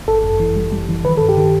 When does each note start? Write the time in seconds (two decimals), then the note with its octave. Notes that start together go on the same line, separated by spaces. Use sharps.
0.08 G1 A4
0.24 F#2
0.40 E3
0.56 G3
0.72 G3
0.89 E3
1.05 D#3 B4
1.17 G2 A4
1.29 G4
1.37 D#3